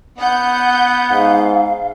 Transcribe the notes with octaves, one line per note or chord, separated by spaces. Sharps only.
B3 F#5 G6
G#2 F5